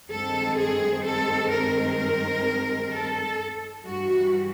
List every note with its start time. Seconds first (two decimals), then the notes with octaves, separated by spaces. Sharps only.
0.11 G2 D#3 G#3 C4 A4
0.57 G#4
1.04 A4
1.51 A#4
2.91 A4
3.85 G2 E3 G3 F#4